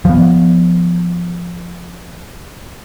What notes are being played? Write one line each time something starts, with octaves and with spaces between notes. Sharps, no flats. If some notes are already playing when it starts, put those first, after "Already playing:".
F3 B3